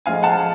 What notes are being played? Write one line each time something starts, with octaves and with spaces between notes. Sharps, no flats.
A2 F3 G#3 F5 G#5
F#5 A5